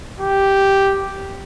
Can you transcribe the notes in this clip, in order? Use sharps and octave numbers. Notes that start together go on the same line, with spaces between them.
G4